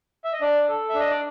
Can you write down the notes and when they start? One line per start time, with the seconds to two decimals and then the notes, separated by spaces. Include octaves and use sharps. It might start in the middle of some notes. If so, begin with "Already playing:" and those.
0.24 E5
0.33 D#5
0.41 D4 D5
0.69 A4
0.89 E5
0.94 D4
1.00 D#5
1.10 D5